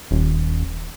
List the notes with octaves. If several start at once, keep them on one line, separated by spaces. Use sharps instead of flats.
D#1